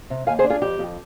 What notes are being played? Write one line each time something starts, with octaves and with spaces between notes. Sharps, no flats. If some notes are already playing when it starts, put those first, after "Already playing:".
C3
D#2 F5 G#5
G#4 C5
D4
F4 G#4
F2 G4
F2